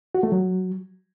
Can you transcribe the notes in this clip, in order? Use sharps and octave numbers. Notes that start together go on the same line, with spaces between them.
F#4
A3
F#3